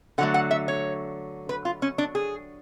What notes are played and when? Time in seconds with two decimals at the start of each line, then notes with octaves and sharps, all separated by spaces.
0.18 D3 F#3 A3 F#5
0.34 F#5
0.51 E5
0.68 C#5
1.49 B4
1.65 F4
1.82 C#4
1.98 D4
2.15 G#4